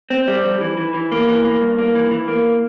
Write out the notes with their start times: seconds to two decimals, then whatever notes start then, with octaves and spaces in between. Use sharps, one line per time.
0.10 C4
0.28 G3
0.44 F2
0.61 E3
0.78 E3
0.94 E3
1.12 A#3
1.28 E3
1.45 A#3
1.61 G2
1.78 A#3
1.95 E3
2.11 E3
2.28 A#3